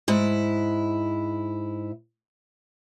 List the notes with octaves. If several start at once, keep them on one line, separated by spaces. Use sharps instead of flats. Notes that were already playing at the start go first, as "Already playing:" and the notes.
G#2 E4